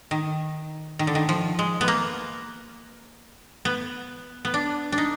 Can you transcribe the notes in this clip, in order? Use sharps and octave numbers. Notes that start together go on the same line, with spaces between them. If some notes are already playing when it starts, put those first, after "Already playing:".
D#3
D#3
D3
D#3
F3
G#3
B3
A#3
B3
B3
D4
D4
D#4